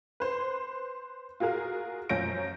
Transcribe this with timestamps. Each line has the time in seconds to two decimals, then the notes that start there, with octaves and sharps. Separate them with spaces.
0.20 B4 C5
1.40 F4 F#4 G#4 A#4 F5
2.09 F#2 F3 C#4 G6 A#6 D7